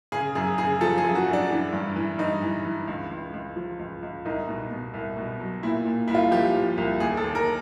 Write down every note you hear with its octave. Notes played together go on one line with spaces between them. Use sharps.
C#3 G#4
F#2 G#4
C#3 G#4
F3 A4
G#4
F#2
F#4
F#2
D4
E3
G2
E3
G2 D#4
E3
E3
C#2
C#2
C#2
F3
C#2
C#2
C2 D#4
B2
B2
C2
B2
F#3
A#2 E4
A#2
C2 E4
F4
F3 G4
F3
C2
D#2 G#4
A4
D#2
A#4